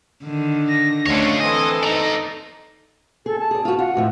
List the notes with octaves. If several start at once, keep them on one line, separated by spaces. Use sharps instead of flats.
D3 D#3
A#6
D2 C#4 D4 F4 C#5 D#5 F#5
E3 C4 A4 D#5 G#5 C6
D#4 D5 A#5
G#4 A4
A5
G#4 D5
F4 F#4
F4 F#5
F2 A2 F3